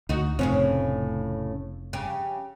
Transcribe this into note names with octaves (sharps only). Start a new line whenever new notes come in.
D2 D#4 F#4
F1 A2 C#3 C4 C#4
C#3 G4